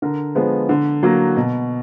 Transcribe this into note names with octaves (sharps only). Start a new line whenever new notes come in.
D3 A#4
F3 G#3 B3
D3
F#3 A#3
B2